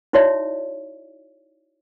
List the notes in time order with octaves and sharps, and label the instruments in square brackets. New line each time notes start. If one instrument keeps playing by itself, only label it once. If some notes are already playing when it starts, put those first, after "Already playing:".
[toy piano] D#4 E4 F#4 C#5 D5 E5